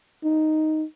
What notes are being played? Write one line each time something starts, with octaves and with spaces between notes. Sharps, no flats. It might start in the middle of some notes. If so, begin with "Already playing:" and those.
D#4